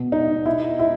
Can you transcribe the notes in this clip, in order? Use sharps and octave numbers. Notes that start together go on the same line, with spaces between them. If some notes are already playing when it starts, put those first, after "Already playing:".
Already playing: B2
D#4
E4
E4